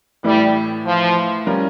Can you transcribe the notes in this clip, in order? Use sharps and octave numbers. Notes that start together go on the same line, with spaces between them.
A2 E3 G3 A3 E4
F3
G3 C#4 F4 A#4